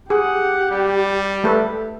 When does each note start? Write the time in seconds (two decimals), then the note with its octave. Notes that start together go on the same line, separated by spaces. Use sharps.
0.10 G4 G#4 F#5
0.71 G3
1.44 A3 A4 B4